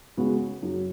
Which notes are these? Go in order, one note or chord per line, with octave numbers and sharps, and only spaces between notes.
C#3 G#3 B3 F#4
F#2 C#3 F#3